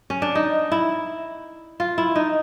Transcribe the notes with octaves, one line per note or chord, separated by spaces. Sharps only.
C#4
D4
D#4
E4
F4
E4
D#4